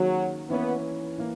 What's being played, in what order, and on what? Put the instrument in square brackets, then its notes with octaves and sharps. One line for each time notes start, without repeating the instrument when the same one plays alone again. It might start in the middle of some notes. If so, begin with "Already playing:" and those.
Already playing: [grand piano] D#3 A#3 C#4 G#4 [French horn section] F#3
[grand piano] E3 A#3 C#4 E4 [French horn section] B3
[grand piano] E3 A#3